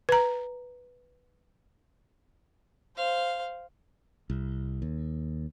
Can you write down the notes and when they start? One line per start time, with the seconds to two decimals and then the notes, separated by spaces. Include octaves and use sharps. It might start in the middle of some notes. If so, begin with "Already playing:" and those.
0.09 B4 A#5
2.96 C5 F5
4.30 C2
4.82 D#2